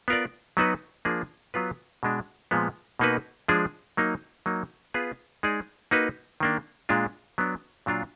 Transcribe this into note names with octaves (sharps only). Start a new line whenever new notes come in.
B3 F4 A#4 D5
F#3 B3 D#4 F#4 B4
F3 A#3 D4 G#4
F#3 B3 F4 B4
B2 G#3 D4
A#2 F3 G#3 B3
B2 A#3 D#4 F#4 B4
F3 G#3 D4 G#4
F#3 A#3 D#4
F#3 A#3 D#4
B3 F4 G#4 B4
G#3 D#4 G#4 D5
A#3 D#4 F#4 B4
D#3 A#3 D4
A#2 G#3 D4 F4
F#3 B3 D4
A#2 F#3 D4 F4